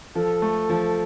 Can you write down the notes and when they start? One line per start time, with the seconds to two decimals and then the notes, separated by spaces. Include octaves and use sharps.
0.15 F3 A4
0.42 A3
0.70 F3